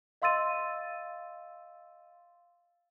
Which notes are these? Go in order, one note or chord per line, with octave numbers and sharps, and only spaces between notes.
D#5 F5 C6 E6 A6 D#7